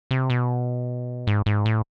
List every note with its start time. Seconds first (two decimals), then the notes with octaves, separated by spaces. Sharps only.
0.11 C3
0.30 B2
1.27 G#2
1.46 G#2
1.66 A2